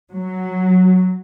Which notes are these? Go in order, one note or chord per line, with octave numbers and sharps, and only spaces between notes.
F#3